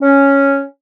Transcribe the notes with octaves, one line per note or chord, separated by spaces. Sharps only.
C#4